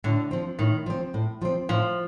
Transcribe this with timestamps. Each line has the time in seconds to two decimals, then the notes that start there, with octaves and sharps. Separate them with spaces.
0.04 A2 D3
0.31 F3 C4
0.59 A2 D#3
0.86 F3 C4
1.14 A2
1.42 F3 C4
1.69 A2 F3